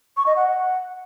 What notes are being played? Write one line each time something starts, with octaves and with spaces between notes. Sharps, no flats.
C#6
D#5
F#5